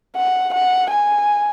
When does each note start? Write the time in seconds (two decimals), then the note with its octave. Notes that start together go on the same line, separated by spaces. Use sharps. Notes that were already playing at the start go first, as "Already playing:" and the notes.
0.16 F#5
0.54 F#5
0.90 G#5